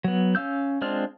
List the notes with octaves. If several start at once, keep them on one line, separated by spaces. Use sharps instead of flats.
F#3 B3
C#4 F5 E6 G6
G#3 C4 D4 F4 F6